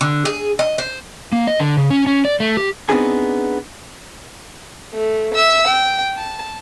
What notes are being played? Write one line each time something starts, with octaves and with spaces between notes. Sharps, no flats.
D3
G#4
D#5
C5
A#3
D#5
D3
C#3
C#4
C#4
D5
A3
G4
B3 C4 D4 D#4 G#4 G#5
A3
E5 E6
G5
A5